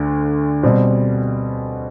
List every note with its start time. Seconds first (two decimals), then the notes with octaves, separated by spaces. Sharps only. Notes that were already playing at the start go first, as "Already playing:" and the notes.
Already playing: D2 D3
0.63 B2 G3 C4